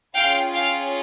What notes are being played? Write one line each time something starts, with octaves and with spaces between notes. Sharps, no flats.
C#4 F4 G#4 F5 G5
F5 G5